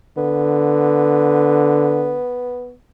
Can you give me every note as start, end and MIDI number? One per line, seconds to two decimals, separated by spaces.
0.17 2.20 50
0.17 2.73 59